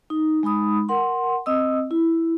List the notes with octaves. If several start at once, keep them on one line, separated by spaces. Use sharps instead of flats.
D#4
G#3 D#4 B5 D#6
A#4 F#5 C6
C4 D#5 D#6 E6
E4